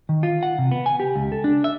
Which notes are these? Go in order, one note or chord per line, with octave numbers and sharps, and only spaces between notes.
D#3
F4
F#5
C3
B3
G#5
G4
C#2
A4
D4
E5